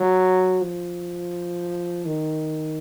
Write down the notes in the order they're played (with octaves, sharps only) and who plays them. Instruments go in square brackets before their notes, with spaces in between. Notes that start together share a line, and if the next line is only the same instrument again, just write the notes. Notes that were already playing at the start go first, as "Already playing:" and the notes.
Already playing: [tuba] F#3
F3
D#3